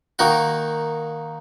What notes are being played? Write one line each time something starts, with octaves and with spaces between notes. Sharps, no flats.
D#3 A#3 D#4 F#4